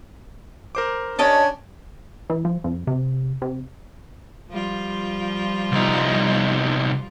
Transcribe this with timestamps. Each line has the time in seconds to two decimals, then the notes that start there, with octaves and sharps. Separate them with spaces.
0.75 A#4 C5 D6
1.19 C#4 D4 G4 C#5 D#5 A5
2.30 E3
2.45 F3
2.64 F2
2.87 C3
3.42 C3
4.50 F3 G3 F4
5.72 C2 D#4